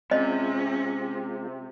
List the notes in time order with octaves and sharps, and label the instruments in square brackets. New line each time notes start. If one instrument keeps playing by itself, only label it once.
[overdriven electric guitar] C3 [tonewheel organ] G#3 F4 [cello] C#4 [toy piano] D#5